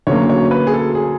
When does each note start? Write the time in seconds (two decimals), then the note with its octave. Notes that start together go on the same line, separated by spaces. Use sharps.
0.07 D2 C#3 F#3 A#3 C#5
0.29 C#5
0.51 B4
0.67 G#4
0.74 A4
0.95 G#4